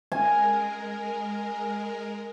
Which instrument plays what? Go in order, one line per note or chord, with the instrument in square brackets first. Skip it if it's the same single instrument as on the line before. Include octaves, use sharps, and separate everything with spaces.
[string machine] G#3 A#4 [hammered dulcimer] G#5